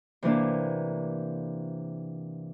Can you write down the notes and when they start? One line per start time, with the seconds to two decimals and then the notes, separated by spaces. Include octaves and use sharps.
0.23 C3 E3 A#3 D4